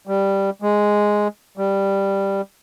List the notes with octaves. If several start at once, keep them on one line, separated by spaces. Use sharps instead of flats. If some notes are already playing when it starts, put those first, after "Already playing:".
G3
G#3
G3